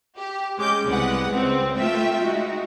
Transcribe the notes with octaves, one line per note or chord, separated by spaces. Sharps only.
G4
G#3 C#4 D6 G6
C2 G#3 B3 B4 F#5
C#2 C4
A3 A#3 F4 E5 G5
G#3 D#4 F#4